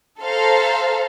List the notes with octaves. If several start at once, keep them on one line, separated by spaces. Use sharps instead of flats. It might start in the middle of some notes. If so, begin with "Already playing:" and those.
A4 C5 F5 A#5